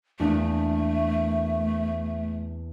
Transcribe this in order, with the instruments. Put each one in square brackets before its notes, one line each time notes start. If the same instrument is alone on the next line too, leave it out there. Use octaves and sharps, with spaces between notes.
[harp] E2 A#3 D4 [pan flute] A3